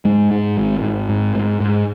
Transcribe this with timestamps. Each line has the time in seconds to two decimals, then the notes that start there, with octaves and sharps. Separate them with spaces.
0.05 G#2 G#3
0.31 G#2
0.57 G#1
0.83 G#1
1.09 G#2
1.35 G#2
1.60 G#2